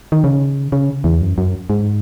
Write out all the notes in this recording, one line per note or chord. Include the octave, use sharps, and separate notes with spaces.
D#3
C#3
C#3
E2
F#2
F#2
G#2